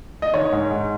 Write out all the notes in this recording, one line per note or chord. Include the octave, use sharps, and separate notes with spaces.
D#5
D#3 C#5
G#2
G#2